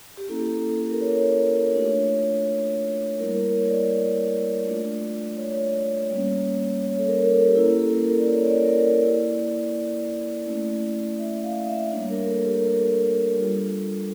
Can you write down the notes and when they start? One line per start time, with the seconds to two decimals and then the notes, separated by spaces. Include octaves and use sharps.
0.17 G4
0.29 A#3 C#4 E4 A4
0.42 G4
0.53 A4
0.77 A4
0.90 A#4
1.01 C#5
1.26 A#4
1.50 C#5
1.74 A3 D4 F4 C#5
3.19 G3 A#3 E4 A#4
3.34 A#4
3.44 C#5
3.68 D5
4.65 A3 D4 F4
5.37 C#5
6.10 G3 A#3 C#4
6.83 C#5
6.99 A4
7.07 A#4
7.22 A#4
7.31 A4
7.46 G4
7.55 A#3 C#4 E4 A4
7.79 A4
7.92 A#4
8.04 A4
8.18 D5
8.28 C#5
8.46 D5
8.65 A#4
8.83 D5
9.01 A#3 E4
9.73 D5
10.46 A3 C#4 E4
11.18 E5
11.43 F5
11.68 E5
11.91 G3 A#3 D4 C#5
12.10 A#4
12.28 A4
12.39 A4
12.46 G4
12.58 A#4
12.64 A4
13.37 G3 D4 F4